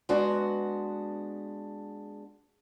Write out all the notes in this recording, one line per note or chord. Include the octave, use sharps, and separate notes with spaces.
G#3 B3 D4 F#4